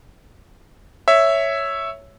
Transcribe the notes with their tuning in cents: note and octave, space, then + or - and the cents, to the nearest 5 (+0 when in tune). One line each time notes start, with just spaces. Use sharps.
C#5 +0 E5 +0